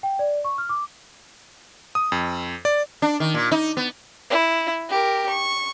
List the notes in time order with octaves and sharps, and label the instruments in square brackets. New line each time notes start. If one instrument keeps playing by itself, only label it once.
[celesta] G5
D5
C#6
F6
D6
[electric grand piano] D#6
F2
D5
[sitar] D4
D#3
A#2
D#4
B3
[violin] E4
G4 A#4
C#6